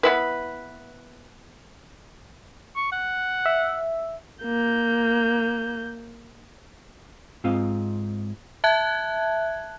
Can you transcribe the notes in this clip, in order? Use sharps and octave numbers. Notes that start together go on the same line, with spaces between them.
B3 E4 B4
C#6
F#5
E5
A#3 G6
G#2 C4 F4 D#5 F5
E5 A5 F#6 G#6